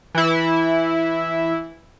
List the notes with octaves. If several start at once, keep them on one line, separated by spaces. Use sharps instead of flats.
E3 E4